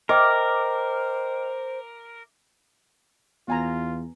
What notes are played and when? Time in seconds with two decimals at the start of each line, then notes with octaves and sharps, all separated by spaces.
0.09 A#4 C5 D#5 G5 D6 F6
3.48 E2 B3 F4 G#5 A#5